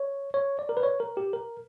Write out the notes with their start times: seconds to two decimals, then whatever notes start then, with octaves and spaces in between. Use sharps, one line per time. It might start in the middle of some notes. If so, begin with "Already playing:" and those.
Already playing: C#5
0.34 C#5
0.59 D5
0.69 A#4
0.77 B4
0.83 C#5
1.00 A#4
1.17 G4
1.33 A#4